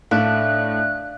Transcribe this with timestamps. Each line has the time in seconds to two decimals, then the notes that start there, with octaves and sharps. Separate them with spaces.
0.11 A2 A3 D4 F5 F#6